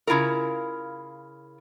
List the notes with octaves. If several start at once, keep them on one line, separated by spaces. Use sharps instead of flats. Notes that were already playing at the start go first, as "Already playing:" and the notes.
C#3 E4 F4 A#4